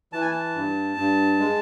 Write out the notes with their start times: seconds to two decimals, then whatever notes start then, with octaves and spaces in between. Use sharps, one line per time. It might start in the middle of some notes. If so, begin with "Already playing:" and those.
0.13 E3 A5
0.21 G#5
0.31 A5
0.55 G2
0.97 G2
1.39 G#3